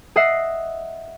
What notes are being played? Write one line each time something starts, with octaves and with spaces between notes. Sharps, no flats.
D#5 E5 F#5 E6 C7